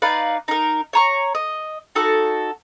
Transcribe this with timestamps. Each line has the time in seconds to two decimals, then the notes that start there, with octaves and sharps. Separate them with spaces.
0.02 D#4 B4 D5 F5
0.48 D#4 A#4
0.93 C#5 A#5 C#6
1.35 D#5
1.95 D#4 F#4 A4 A5